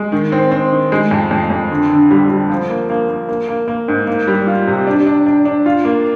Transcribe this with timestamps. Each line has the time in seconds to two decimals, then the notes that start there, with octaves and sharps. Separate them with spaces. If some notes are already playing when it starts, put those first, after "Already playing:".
Already playing: G#3
0.12 D#3
0.32 C4
0.51 C4
0.72 D#3
0.92 G#3
1.11 F2
1.31 F2
1.50 F2
1.70 D3
1.90 D3
2.11 G3
2.30 G3
2.49 F3
2.69 A#3
2.90 A#3
3.09 A#3
3.29 A#3
3.48 A#3
3.68 A#3
3.88 G#2
4.07 A#3
4.27 G3
4.47 F4
4.67 C3
4.87 D4
5.07 D4
5.26 D4
5.45 D4
5.66 F4
5.85 A#3